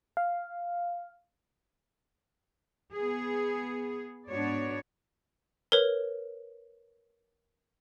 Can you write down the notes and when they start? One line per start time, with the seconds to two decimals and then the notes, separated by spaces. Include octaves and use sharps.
0.17 F5
2.94 B3 G#4
4.28 G#2 B3 D4 F#4 C#5 D5
5.72 A#4 B4 C#5